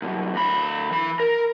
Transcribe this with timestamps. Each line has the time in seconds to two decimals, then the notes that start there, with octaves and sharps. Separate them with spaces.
0.02 C2 F#2
0.34 D2 B5
0.91 E3 B5
1.20 A#4